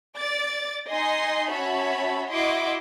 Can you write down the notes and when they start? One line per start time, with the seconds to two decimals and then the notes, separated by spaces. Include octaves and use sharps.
0.17 D5 D6 A6
0.90 D#4 D#5 G#5 C6 A#6 C7
1.49 C#4 F#4 C#5 E5 A5 B5
2.30 E4 F#4 D#5 C6 D6